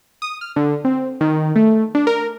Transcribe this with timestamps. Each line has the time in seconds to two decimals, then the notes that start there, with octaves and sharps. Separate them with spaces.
0.22 D#6
0.41 F6
0.56 D3
0.85 C4
1.21 D#3
1.56 A3
1.95 D4
2.07 A#4